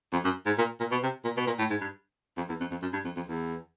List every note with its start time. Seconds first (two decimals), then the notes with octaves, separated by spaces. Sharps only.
0.13 F2
0.24 F#2
0.46 G#2
0.58 A#2
0.80 A#2
0.92 B2
1.03 C3
1.25 A#2
1.37 B2
1.47 A#2
1.59 A2
1.70 G#2
1.81 G2
2.37 F2
2.49 E2
2.60 F2
2.71 F2
2.82 F#2
2.93 G2
3.05 F2
3.16 F2
3.27 E2